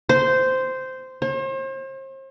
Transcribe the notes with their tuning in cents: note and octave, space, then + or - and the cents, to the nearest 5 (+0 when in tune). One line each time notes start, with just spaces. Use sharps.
C5 -10
C5 +40